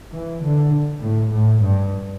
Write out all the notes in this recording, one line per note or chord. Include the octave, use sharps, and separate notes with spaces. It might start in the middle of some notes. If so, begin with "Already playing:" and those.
E3
D3
A2
A2
G2